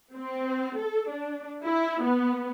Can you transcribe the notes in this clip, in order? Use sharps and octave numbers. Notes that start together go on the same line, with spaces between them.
C4
A4
D4
E4
B3